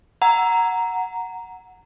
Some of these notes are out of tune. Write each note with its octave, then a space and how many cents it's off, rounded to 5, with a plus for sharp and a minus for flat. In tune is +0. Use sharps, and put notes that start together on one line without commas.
F#5 +0 A#5 +0